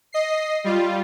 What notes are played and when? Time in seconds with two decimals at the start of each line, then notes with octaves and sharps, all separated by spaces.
0.12 D#5 C7
0.64 G3 F4